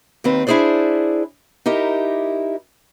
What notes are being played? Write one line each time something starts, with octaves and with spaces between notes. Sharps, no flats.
D#2 D#3 C4 B4
D4 E4 F4 G#4 C5 D5
D#4 E4 G4 A#4